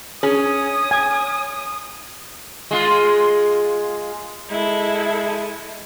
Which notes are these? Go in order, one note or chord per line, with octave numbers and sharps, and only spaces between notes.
C#4 G#4 D#6
G#5
G#3 F4
G#3 E4 A4